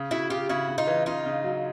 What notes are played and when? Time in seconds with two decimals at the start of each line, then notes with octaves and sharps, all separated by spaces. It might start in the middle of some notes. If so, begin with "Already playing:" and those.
Already playing: C#3
0.11 C#3 E4 F#4
0.30 C#3 F4 G4
0.49 C#3 E4 F#4
0.69 C#3
0.78 D#4 F4
0.87 E3
1.06 C#3 D#4 F4
1.26 C#3
1.44 F#3